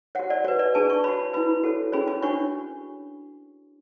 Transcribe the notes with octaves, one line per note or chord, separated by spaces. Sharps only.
F#4 C#5 F#5
D5
F#4 B4 C#5
D5
D4 G#4 B4 A5
C#6
F#4 C#5 B5
E4 B4 B5
F#4 A4 C#5
C#4 G#4 C#5 B5
B5
D4 F#4 C#5 C#6